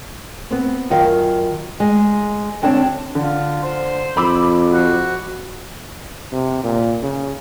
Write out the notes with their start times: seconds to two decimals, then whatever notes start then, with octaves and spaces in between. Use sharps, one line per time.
0.51 B3 C4
0.90 F#2 D#3 F4 F5
1.80 G#3
2.62 D2 C4 D4 C#5 A5
3.15 D3 F4
3.63 C5
4.17 F2 B5 D6 E6
4.72 F#4
6.32 C3
6.63 A#2
7.02 C#3